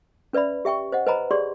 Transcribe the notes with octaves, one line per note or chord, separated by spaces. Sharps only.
C#4 B4 D5 E5 B5
G4 E5 G5 C#6
C5 D#5 F#5
B4 C5 D#5 G#5 A#5 B5
G4 G#4 C#5 D5 C6